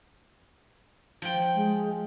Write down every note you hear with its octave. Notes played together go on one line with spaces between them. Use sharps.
F3 G5
G#3